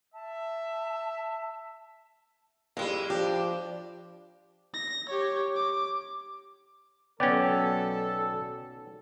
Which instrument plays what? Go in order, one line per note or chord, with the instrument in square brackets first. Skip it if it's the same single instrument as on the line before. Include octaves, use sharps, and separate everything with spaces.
[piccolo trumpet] E5 [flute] A5
[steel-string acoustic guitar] F2 G3 [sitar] G#3 E4
[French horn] F3 [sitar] D4 [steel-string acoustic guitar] G4
[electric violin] A#6
G4 C#5
D6
[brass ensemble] B1 A4 [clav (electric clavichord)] B3 C#4 [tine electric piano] D5 G5